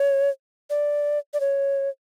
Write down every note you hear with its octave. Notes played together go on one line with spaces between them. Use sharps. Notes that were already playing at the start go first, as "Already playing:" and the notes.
Already playing: C#5
D5
D5
C#5